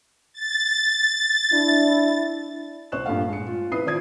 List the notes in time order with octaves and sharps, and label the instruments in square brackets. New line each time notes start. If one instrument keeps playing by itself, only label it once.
[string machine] A6
[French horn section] D4 E4
[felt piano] C2 C5 C#6 F#6 E7
G2 A#2 A3 F5
G#3 C#7
F4
C3 E4 B4 D#6 C7
D#3 C4 F4 D5 D#6 G#6